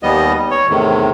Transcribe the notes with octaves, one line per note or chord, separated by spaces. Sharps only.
D#2 G3 B3 D#5
C#5
E2 A2 C3 D#3